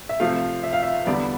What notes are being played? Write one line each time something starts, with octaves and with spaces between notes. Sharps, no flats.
E5
C3 F3 A3 F5
E5
F5
E5
E2 D3 G3 B3 D5